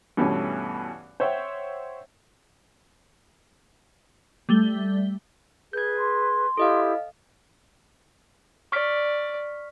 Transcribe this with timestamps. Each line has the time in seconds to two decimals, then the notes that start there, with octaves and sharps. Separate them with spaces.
0.17 G2 B2 E3 A3 C#4
1.20 C5 C#5 E5 F#5 G5
4.49 G3 A3 G7
5.73 G#4 B4 G6 G#6
5.98 C6
6.57 E4 G4 A4 D#5 F5 D#6
8.72 D5 C#6 F6 B6